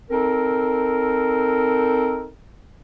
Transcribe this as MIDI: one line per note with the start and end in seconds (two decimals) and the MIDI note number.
0.10 2.29 60
0.10 2.29 63
0.10 2.29 69
0.10 2.29 70